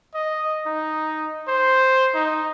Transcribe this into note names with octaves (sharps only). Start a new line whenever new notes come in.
D#5
D#4
C5
D#4